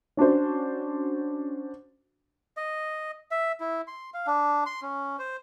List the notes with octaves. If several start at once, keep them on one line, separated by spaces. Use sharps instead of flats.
C#4 D4 F#4 C5
D#5
E5
E4
C6
F5
D4
C6
C#4
C5